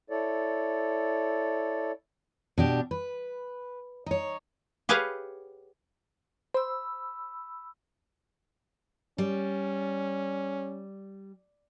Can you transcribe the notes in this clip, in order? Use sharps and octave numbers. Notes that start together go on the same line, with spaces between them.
E4 A4 C#5 D5
B2 D4 G4
B4
D#4 C#5
G4 G#4 B4 C#5 F5 F#5
C5 B5 E6
G3 C#4